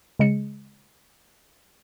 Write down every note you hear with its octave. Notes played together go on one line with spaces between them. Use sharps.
C#3 G#3 C#7